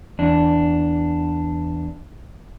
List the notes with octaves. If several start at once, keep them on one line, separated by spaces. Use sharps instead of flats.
E2 D4